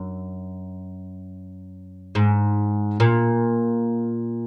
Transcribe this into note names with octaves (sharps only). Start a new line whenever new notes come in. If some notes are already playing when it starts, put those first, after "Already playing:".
Already playing: F#2
G#2
A#2